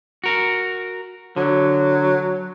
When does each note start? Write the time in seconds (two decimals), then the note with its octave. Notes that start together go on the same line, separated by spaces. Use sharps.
0.24 F#4 A#4
1.36 D3 F#3